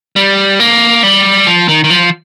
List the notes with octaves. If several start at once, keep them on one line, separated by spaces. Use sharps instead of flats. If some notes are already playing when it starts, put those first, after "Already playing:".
G3
A#3
G3
F3
D#3
D#3
F3